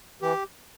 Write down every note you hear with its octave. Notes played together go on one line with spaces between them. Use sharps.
E3 G4